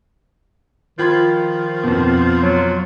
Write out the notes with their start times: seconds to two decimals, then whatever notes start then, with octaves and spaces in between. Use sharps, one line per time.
0.99 D#3 F3 F4 B5 G#6
1.84 F2 B2
2.42 F#3